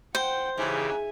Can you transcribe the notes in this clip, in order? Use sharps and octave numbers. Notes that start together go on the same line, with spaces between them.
C5 F#5 G5
G#2 C#3 E3 G4 E5 G#5